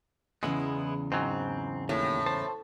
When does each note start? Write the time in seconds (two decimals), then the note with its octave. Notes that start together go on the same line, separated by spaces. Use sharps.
0.43 E2 C#3 E3 G#3 B3 E4
1.12 G#2 F#3 C4
1.89 D#2 A2
2.26 C5 A5